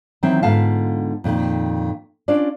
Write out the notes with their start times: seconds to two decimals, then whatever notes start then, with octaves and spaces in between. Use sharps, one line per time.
0.23 D#3 E3 F#3 C4 E4
0.43 G#2 D3 B3 F4 F5 A5
1.24 F2 A#2 D#3
2.28 C#4 D4 F4 D5